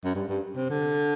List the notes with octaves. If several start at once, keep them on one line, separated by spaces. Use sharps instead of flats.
F#2
G2
G2
C3
D3